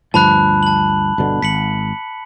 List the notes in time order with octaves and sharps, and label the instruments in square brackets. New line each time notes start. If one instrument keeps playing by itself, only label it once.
[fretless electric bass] D2 G2 F3 [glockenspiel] A5 B5 F#6
[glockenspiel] A5 F#7
[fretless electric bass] G1 B2 D3
[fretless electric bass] G#1 [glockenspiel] B6 C#7 F#7